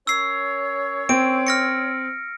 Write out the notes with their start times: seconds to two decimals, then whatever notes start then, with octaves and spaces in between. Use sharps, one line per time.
0.07 C#4 A#4 C#5 E6 C7
1.09 C4 D7
1.47 F6 A#6 C#7